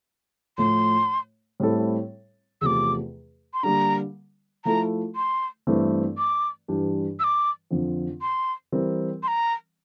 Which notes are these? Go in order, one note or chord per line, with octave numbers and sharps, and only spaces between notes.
A2 F3 A3 C6
A2 G3 C4 E4 A4
E2 C3 F3 A3 D6 E6
C6
D3 G3 A#3 A#5
F3 A3 E4 A4 A#5
C6
G2 E3 A3 C4 E4
D6
G2 E3 G3 D4 G4
E6
D6
F2 D3 F3 C4
C6
E3 G3 C4 E4 A#4
C6
A#5